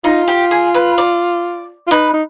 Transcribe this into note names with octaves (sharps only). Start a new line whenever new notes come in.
D#4 F4
G4
G#4
B4
D5
F4
D#4 B4
D#4